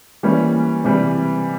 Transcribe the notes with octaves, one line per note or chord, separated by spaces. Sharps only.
E3 G3 A#3 C#4
C3 E3 G3